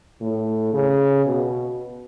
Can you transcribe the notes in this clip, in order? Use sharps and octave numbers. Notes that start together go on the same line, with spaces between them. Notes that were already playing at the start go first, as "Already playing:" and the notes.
A2
C#3
B2